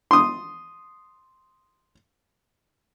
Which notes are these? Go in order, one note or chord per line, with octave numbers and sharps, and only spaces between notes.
C6 D#6